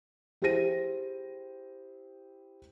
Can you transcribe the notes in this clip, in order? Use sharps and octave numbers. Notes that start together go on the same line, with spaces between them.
E4 G4 G#4 C5 A#6 D#7